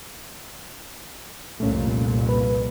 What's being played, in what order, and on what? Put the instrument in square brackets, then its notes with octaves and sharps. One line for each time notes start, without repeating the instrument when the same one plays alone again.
[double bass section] C2 F2 A#2 [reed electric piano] A3 C#4
[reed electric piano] A#3 B4